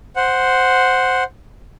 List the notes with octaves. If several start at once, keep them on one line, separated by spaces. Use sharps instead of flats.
C5 F#5